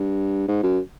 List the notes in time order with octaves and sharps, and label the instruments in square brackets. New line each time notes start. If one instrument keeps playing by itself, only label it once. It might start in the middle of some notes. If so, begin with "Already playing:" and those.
Already playing: [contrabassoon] G2
G#2
F#2